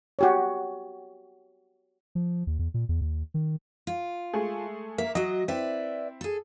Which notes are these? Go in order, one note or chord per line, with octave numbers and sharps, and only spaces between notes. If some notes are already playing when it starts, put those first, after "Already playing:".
F#4 G4 C#5
F3
D#2
E2
A#2
E2
D#2
D#3
F4
G#3 A3 G#4
A#3 E5
F#3 F#4 D#5
C4 E4 B4 D5 E5
G#4 A4